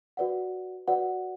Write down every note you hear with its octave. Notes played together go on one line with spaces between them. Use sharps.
F#4 B4 D5 F#5
F#4 B4 D5 F#5